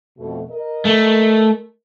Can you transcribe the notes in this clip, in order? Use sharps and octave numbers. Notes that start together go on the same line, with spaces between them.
F2 B2 A3
A#4 D#5
A3